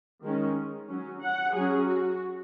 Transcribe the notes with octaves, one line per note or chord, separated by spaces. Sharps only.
D#3 G#3 C#4
F#3 C#4
F#5
F#3 C#4 G#4
F#4